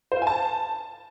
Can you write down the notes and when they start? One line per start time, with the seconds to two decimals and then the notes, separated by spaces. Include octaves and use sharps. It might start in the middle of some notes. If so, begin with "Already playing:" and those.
0.12 C5
0.17 F5
0.22 G#5
0.27 A5